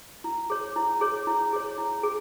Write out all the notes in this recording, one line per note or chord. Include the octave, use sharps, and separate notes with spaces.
E4
G#4 C#5
E4
G#4 C#5
E4
G#4 C#5
E4
G#4